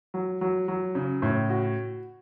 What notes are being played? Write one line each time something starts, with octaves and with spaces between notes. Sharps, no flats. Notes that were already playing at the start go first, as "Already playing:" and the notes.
F#3
F#3
F#3
C#3
A2
F#4